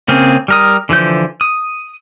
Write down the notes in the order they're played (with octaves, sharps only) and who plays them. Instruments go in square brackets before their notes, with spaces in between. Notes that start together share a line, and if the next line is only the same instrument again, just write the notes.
[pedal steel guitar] C#3 A#3 C4 G#4
G3 A#4 D#6
D3 E3 F3 G6
D#6